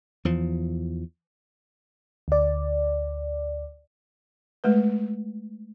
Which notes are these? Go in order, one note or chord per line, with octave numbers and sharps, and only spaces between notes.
E2 F3
D2 D5
G#3 A3 B4